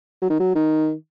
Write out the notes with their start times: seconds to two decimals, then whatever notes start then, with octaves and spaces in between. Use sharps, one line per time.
0.22 F#3
0.30 D#3
0.40 F#3
0.55 D#3